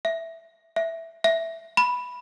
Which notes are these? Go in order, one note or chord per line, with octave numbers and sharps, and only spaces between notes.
E5
E5
E5
B5